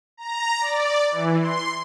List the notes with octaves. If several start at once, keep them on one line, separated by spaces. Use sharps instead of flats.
A#5
D5
E3
C6